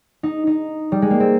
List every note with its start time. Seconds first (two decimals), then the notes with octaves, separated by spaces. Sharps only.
0.23 D#4
0.47 D#4
0.92 G3
1.02 G#3
1.10 A#3
1.20 C4